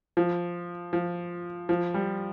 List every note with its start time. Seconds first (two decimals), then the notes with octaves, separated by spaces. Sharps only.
0.17 F3
0.93 F3
1.69 F3
1.94 G3